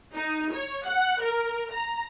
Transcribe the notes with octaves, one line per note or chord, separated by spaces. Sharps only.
D#4
C#5
F#5
A#4
A#5